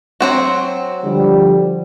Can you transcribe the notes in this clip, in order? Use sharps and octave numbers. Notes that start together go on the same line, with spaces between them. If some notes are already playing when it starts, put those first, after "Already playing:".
F#3 C4 F#4
D3 F3 G3